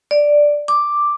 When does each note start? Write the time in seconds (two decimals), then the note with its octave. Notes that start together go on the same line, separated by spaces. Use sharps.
0.11 D5
0.68 D6